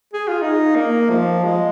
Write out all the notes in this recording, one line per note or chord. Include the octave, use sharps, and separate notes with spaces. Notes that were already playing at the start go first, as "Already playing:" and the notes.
G#4
F4
D#4
A#3
F3
G#3